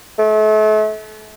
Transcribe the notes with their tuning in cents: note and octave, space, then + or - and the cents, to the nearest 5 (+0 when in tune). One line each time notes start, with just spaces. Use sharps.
A3 -40